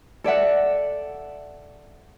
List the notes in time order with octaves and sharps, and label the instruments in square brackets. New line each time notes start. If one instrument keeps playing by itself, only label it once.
[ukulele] A4 D5 E5 F#5